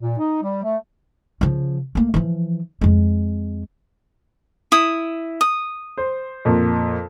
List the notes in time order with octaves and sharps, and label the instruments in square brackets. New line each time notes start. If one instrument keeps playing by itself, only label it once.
[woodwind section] A#2
D#4
G3
A3
[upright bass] C#3 F3
A3 A#3
E3 F3
F2 G#3
[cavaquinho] E4 D#6
D#6
[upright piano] C5
F2 A#2